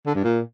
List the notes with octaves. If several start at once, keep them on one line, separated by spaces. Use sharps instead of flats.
D3
G2
A#2